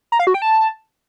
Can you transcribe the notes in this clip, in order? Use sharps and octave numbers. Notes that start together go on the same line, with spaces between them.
A#5
F5
F#4
G5
A5